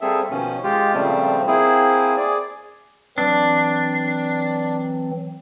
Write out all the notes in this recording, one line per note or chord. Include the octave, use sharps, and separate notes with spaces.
G3 A#3 C4 G#4 A4 E5
B2 D#3 F3 C#4
G#3 F4 G4
A#2 C#3 F3 G3 A3 C4
A#3 C4 E4 G#4
G#4 D5
E3 F#3 C4 D4